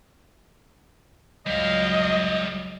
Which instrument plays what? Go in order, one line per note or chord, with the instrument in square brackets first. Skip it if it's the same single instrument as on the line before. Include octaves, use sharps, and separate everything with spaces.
[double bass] C#2 F#3 [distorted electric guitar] G3 F5 [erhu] D#5